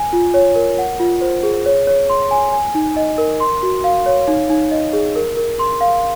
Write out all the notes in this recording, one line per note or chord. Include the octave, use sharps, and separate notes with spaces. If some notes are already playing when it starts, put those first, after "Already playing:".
Already playing: G#5
F4
C#5
A#4
F#5
F4
C5
G#4
C#5
C#5
C6
G#5
G#5
D#4
D#5
A#4
C6
F#4
F5
C#5
D#4
D#4
D#5
G#4
A#4
A#4
C6
F5